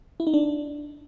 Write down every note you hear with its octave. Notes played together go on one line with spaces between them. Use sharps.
E4
D#4
D4